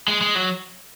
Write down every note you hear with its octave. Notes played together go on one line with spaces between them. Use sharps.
G#3
G#3
F#3